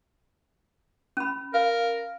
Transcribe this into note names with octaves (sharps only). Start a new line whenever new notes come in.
C#4 B5
A#4 F5